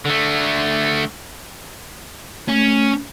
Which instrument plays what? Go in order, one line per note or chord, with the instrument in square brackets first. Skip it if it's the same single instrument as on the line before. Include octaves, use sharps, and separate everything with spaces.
[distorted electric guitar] D3 A3
[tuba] A3 [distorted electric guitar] C#4